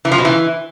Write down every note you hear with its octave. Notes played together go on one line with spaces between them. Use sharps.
E3
F3
B2
E3